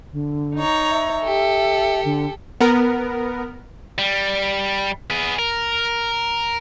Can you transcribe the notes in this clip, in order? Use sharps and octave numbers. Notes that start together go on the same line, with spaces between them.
D3
D#4 C#5 A#5
E5
G4 A4
D3
B3 A#4
G3
B3 G#4
A#4